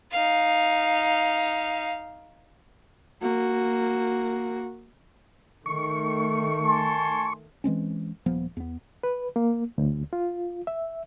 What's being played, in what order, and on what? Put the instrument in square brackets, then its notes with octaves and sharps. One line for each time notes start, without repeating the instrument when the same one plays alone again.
[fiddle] D#4 F5
[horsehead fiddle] A#3 F#4
[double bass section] D#3 A3 [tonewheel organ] C#6
[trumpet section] G#5 A5 C6
[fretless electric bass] E3 G#3 C4 C#4
D#1 F3 B3
E2 B3
[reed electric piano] B4
A#3
D2
F4
E5